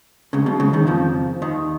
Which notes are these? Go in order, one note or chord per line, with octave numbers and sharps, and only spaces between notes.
C#2 C#3
B1 B2
C#2 C#3
D#2 D#3
F2 F3
D#2 D#3